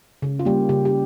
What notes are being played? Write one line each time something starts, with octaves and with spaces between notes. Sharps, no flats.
C#3
F4
G3 A#3 G4
C#3 G4
G4